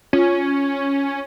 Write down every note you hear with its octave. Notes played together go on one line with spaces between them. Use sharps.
C#4 F4